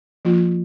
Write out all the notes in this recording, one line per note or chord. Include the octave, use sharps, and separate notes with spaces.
F3 A#3 F4